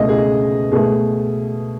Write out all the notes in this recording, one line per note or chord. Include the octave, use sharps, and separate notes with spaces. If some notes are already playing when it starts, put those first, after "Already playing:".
Already playing: C#2 B2 A3 D#5
G#4
B2 A3 G#4